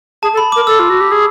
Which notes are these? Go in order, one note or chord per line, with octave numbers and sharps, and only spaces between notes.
G#4 A5
A4
B5
D6
A#4
A4 E6
F4
F#4
G4
G#4